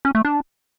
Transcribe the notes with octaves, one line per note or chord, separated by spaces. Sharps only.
C#4
A3
D4